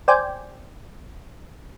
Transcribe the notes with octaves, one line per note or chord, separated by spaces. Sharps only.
C5 D5 G5 G#5